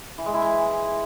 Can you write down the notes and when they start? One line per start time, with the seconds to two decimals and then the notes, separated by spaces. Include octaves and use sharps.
0.18 E3
0.26 G#3
0.34 E4
0.42 E3